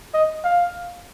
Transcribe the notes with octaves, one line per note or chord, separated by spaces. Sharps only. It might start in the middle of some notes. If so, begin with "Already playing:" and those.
D#5
F5